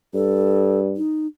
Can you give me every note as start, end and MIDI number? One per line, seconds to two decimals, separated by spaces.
0.14 0.97 43
0.14 0.79 69
0.96 1.27 63